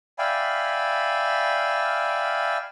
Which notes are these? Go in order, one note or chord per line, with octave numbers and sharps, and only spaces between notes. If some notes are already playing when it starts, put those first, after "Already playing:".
D5 E5 F5 G5 G#5 B5